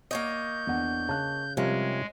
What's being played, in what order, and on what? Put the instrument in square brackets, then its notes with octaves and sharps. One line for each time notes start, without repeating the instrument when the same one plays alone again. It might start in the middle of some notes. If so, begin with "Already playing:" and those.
[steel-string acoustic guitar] A#3 C#5 D#5 [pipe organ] G6
[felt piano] E2 D4 F#5
[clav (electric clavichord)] C#3 [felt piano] A5 F#6
[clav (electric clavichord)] C3 F3 A#4 [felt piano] G3 [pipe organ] G#3 [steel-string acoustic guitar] C#4